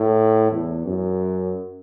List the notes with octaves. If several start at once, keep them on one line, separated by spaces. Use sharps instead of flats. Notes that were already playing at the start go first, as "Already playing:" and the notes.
Already playing: A2
E2
F#2